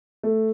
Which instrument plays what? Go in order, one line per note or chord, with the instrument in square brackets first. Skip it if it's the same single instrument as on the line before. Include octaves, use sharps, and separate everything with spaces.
[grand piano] A3